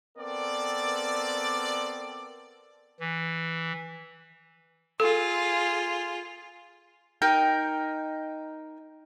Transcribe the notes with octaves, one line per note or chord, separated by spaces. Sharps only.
B3 C4 A4 A#4 D5
E3
F4 G#4 A4
D#4 A#4 G5